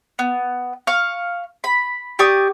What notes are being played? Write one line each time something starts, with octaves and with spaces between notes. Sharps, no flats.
B3
F5 C#6
B5
G4 D5 C#6 D#6